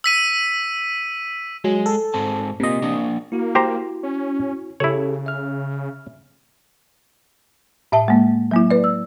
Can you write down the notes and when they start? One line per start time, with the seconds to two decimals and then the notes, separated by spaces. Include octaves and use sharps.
0.04 E6 B6 D#7
1.64 F#3 G#3 G#4
1.86 A4
2.14 G#2 C4 A5
2.60 C3 A#3 F4 D#5
2.82 A#3 D4
3.32 A#3 E4 F#4
3.55 G4 C5 A#5
4.03 C#4
4.80 C#3 E4 G4 A4 C#5
5.26 E5 F6
7.92 A2 E5 A5
8.08 G#3 A#3
8.51 F#3 A#3 E4
8.71 B4 D5
8.84 E6